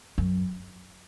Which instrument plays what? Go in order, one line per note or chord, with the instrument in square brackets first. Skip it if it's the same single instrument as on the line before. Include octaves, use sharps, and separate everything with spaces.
[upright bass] F#2